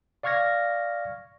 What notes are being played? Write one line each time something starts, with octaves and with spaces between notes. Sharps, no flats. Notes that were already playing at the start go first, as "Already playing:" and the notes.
D5 F5 C#6 F6 G#6 A#6